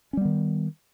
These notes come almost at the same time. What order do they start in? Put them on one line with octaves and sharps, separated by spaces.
C#4 G3 B3 D#3